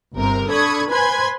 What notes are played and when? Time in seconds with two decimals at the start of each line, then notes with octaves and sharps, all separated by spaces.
0.15 G1 C3 A#4
0.50 D4 A4 B5 C#6 D#6 G#6
0.90 B4 C5 G#5 B5 C6 G#6